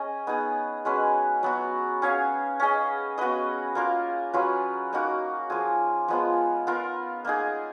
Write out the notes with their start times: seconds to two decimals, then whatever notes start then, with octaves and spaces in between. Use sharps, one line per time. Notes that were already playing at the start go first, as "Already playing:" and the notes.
Already playing: C#4 G#4 D#5
0.27 B3 D#4 G#4
0.85 G#3 C#4 F#4 B4
1.43 F#3 B3 F#4
2.02 C#4 G#4 C#5 F5
2.60 C#4 G#4 D#5
3.18 B3 F#4 B4 D#5
3.75 A#3 F4 A#4 F5
4.33 F#3 C#4 F4 B4
4.93 A#3 D#4 F#4 A#4
5.50 F3 A#3 F4 G#4
6.08 F3 G#3 B3 F4
6.67 B3 F4 A#4
7.25 A#3 D#4 G#4